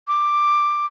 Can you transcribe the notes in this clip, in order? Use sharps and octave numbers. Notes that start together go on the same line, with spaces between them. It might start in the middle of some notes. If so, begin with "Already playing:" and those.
D6